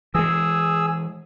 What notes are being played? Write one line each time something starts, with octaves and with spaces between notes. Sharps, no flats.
E3 G#3 G#4 E6